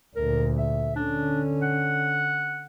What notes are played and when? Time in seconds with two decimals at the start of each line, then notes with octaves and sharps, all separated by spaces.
0.16 D2 A#2 A#4
0.58 E5
0.96 D3 C#4 D4
1.62 F#5